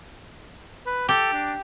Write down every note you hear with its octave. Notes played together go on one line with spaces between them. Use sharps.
B4
G4 A4
D4